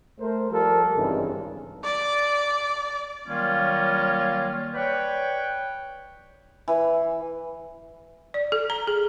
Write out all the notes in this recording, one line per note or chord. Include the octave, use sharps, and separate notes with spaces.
A3 A#4 C5
F3 G3 A4 A#4
G#1 G2 C#3 E3 C4 D#4
D5
D#3 F#3 G3 A#3 C#4 F4
B4 C#5 D5 F#5 G5
E3
D5
A4
A#5
G#4